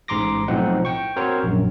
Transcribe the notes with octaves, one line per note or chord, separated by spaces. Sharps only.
A1 G#2 A#5 C6 D6 A#6
B1 A2 F3 C4 D#4 F#5
G5 C#6
C4 F#4 A#4 C5 C#5
A#1 F#2